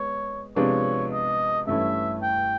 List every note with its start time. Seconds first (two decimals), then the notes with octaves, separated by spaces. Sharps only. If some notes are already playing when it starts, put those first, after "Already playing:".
Already playing: G#3 B3 C#5
0.56 C3 F3 G#3 B3 D4 C#5
1.12 D#5
1.67 G2 E3 A3 C#4 E4 E5
2.22 G5